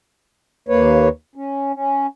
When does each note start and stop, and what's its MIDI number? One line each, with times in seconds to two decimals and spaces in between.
0.68 1.09 39
0.68 1.09 58
0.68 1.09 71
0.68 1.09 73
1.36 1.73 61
1.74 2.07 61